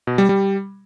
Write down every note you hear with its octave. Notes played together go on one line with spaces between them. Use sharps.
B2
G3
G3